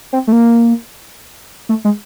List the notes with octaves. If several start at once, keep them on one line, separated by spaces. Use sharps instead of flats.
C4
A3
A#3
A3
G#3